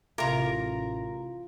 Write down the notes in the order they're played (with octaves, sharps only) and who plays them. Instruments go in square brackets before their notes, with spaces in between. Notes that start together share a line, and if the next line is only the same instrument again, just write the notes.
[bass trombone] A1 [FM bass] C3 [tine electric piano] F4 [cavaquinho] A#4 A#5